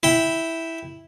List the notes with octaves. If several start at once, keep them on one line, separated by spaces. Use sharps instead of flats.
E4 G5